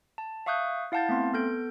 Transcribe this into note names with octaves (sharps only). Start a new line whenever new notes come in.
A5
E5 F5 C#6 D#6 F#6 G6
E4 F5 F#5 A5 G6 A6
A3 B3 C4 C6
B3 A4 G6 D7